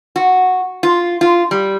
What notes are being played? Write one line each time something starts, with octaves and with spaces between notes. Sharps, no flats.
F#4
F4
F4
G3